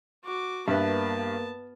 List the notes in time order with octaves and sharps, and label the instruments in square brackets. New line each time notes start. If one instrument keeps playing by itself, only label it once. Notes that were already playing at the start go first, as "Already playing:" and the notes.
[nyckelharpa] F#4 D6
[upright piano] G2 [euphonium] A#3 [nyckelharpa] B3 A5 [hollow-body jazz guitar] B4 E5